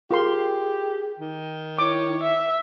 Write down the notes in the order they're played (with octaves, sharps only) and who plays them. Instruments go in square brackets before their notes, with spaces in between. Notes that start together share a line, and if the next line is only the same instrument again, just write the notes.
[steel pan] F4 A#4 C6 [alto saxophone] G4 [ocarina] G#4
[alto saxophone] D#3
[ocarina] E4 [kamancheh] C#5 [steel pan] D6
[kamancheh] E5